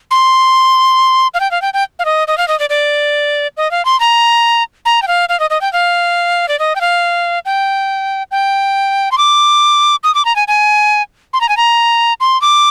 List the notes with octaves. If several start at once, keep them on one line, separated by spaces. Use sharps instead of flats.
C6
F5
G5
F5
G5
G5
F5
D#5
D#5
F5
D#5
D5
D5
D#5
F5
C6
A#5
A#5
G5
F5
F5
D#5
D#5
G5
F5
D5
D#5
G5
F5
G5
G5
C6
D6
D#6
D6
A#5
G#5
G#5
C6
A#5
G#5
A#5
C6
D6